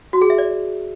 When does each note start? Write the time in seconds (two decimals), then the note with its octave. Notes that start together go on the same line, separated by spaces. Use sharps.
0.13 F#4
0.22 G#4
0.30 E5
0.38 D5